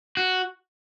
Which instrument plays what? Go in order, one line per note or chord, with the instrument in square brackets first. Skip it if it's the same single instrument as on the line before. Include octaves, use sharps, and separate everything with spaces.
[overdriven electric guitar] F#4